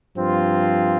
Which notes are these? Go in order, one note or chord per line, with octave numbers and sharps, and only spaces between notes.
G2 F3 C4 F4